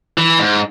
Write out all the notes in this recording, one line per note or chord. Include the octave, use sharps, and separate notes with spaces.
E3
G#2